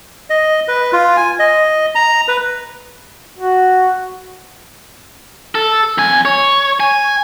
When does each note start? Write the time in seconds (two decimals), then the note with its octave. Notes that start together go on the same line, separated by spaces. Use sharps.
0.30 D#5
0.68 B4
0.93 F4
1.17 G#5
1.39 D#5
1.95 A#5
2.28 B4
3.38 F#4
5.55 A4
5.98 F2 G#5
6.25 C#5
6.80 G#5